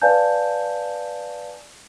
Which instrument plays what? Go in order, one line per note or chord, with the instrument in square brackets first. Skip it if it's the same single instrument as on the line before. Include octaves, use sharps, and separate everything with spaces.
[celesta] B4 D5 F5 G#5 A5 G6